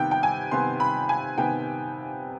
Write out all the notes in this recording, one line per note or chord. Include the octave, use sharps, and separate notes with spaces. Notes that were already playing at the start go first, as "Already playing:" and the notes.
Already playing: C3 D#3 B3 G5
G5
G#5
C3 D#3 B3 C6
B5
G#5
C3 D#3 B3 G5